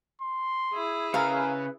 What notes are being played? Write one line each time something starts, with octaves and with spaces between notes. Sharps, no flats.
C6
E4 G#4
C#3 A#4 B4 F5